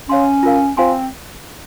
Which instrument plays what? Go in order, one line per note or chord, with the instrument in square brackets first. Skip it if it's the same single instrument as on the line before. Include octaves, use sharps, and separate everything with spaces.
[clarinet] C#4 [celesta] C#5 F5 C6
[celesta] F4 A#4 F5
[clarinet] C4 [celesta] F4 C5 F5 G#5 C6